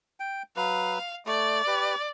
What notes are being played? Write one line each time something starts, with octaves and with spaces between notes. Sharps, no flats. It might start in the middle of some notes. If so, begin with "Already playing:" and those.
G5
F#3 B4 F5
A3 D5
G4 B4